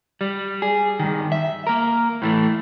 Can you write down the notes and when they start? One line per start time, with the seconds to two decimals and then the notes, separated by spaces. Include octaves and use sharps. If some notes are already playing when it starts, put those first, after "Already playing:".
0.21 G3
0.62 G#4
0.99 G2 D#3
1.32 E5
1.67 A#3 A#4
2.22 A2 E3 A3